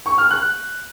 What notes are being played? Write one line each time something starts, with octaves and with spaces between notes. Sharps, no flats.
C#6
F6
F#6